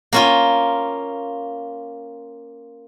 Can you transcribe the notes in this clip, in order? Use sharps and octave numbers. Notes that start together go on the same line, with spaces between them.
A#3 C#4 F4